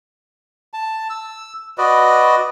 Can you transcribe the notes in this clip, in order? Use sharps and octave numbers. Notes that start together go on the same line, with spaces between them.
A5
E6
F#4 B4 D5 D#5